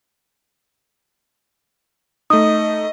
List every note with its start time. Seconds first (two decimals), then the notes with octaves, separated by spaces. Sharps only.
2.30 A3 D#4 D#5 D#6